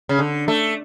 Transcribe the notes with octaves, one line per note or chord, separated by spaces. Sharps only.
C#3
D3
A3